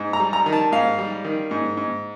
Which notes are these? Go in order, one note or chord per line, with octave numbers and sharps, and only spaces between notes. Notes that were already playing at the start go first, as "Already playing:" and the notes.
Already playing: G#2
A#5
G3
A#5
D#3
A5
G#2 F5
G3
D#3
G#2
G#2